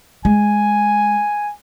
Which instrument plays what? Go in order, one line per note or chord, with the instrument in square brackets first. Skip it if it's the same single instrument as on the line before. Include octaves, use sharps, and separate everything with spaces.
[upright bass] G#3 [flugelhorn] G#5